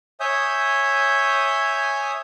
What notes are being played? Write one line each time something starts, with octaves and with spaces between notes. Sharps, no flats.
C#5 E5 G#5 D#6 G6